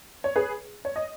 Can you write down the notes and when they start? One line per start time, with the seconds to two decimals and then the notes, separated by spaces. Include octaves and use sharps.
0.24 C#5
0.36 G#4 B4
0.85 C#5
0.96 D#5